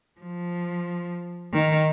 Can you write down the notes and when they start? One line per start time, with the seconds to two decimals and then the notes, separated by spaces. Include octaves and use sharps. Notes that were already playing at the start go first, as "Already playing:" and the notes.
0.20 F3
1.53 D#3